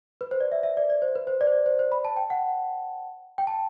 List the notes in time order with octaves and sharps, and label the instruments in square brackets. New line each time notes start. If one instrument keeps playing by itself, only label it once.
[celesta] B4
C5
D5
E5
E5
D5
D5
C5
B4
C5
D5
C5
D5
C5
C5
B5
A5
G5
F#5
G5
A5